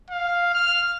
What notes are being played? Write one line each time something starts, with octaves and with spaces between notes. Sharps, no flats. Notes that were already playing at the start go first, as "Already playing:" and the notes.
F5
F6